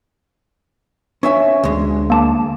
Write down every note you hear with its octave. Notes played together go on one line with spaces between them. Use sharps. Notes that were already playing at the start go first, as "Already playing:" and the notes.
C#4 E5 G#5
D2 G#3
A#3 A5 D6